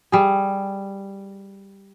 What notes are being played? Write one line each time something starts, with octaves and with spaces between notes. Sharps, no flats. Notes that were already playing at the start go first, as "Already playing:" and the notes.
G3 G#4